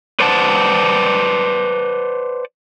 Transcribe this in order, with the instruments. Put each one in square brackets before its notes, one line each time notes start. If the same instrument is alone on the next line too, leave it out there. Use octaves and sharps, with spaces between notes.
[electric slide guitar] B4 C5 D5 F#5 A5